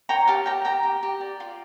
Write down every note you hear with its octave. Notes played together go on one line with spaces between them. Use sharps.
C#5 G5 A#5
G4 F5 A5
G4 G5 A#5
G4 G5 A#5
G4
G4
D5
F4